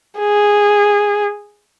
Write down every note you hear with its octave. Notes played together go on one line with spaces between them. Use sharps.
G#4